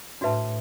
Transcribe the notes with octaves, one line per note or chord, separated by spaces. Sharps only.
A2 D4 F#4 B4 E5 A5